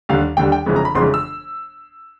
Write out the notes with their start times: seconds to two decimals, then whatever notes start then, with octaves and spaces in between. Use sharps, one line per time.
0.09 D#2 D3 G3 F5
0.37 D#2 D3 G3 G5
0.52 G5
0.66 G1 F2 C#3 E3 G#3
0.76 A#5
0.85 B5
0.95 G1 F2 C#3 E3 G#3 C6
1.14 E6